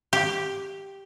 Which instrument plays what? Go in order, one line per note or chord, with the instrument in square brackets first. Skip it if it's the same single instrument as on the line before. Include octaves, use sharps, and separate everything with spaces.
[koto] G4